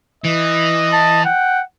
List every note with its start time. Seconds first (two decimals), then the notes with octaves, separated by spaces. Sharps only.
0.24 E3 D#5
0.93 A5
1.25 F#5 G5